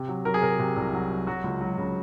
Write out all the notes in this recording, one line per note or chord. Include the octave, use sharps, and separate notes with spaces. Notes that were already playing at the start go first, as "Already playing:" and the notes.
Already playing: C3
F#3
F#3 A#4
G#4
C3 A#4
C3
C2
F#3
F#3
F#3 F#4
C#2
F#3
C#3